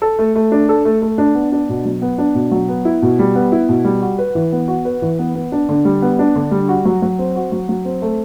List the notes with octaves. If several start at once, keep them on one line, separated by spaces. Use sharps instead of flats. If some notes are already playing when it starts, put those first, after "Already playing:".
A4
A3
A3
D4
A4
A3
A3
D4
B3
D4
B2
F#3
B3
D4
B2
F#3
B3
E4
B2
G3
B3
E4
B2
G3
F#4
B4
E3
B3
F#4
B4
E3
B3
B3
D4
D3
G3
B3
D4
D3
G3
F#4
F#3
F#3
C4
F#4
F#3
F#3
C4
A3